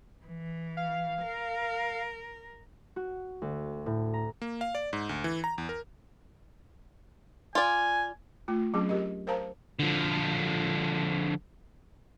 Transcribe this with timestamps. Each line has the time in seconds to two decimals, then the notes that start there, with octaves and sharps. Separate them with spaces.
0.26 E3
0.77 F5
1.22 A#4
2.96 F#4
3.42 D2
3.86 A2
4.14 A#5
4.42 A#3
4.61 F5
4.75 D5
4.93 G#2
5.09 D2
5.24 E3
5.44 A#5
5.58 E2
5.69 A#4
7.55 F4 D5 G#5
8.48 A3 F4
8.74 F#3 C4 C#4 G#4
8.89 G4 A#4 D#5
9.27 A#4 C5 F5 A5 A#5
9.79 D3 F3